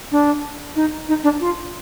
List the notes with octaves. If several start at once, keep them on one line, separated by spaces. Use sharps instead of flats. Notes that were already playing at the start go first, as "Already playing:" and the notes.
D4
D#4
D#4
D4
F4